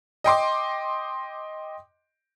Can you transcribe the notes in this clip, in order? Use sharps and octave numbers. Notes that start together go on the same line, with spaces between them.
D#5 G5 C6 D6